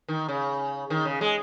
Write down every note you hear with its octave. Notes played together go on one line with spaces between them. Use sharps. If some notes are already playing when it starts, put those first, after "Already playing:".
D#3
C#3
D#3
C#3
G#3